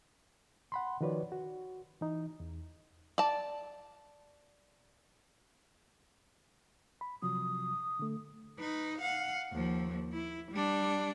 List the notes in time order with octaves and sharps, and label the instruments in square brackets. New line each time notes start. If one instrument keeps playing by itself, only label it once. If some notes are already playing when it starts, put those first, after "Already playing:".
[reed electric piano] F#5 B5 C6
D#3 F3 F#4 B4 C#5 D5
F#4
E3 D#4
E2
[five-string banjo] D5 A5
[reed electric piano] B5
[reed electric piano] C3 F3 F#3 [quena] D#6
[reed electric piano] D3 A3
[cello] D#4 B4
F5 F#5
D#2 F3
E4
G3 D4